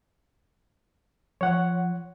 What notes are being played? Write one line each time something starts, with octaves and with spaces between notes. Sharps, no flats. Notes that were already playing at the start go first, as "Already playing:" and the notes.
F3 C#5 F#5